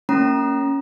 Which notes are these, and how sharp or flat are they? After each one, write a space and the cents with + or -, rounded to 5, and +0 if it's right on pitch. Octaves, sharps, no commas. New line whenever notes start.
A#3 -20 C#4 +0 A#5 +20